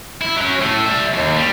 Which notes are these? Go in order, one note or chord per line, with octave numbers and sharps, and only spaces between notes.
E4
F#3 C#4
A2 A3
G3 E5
D#2
G3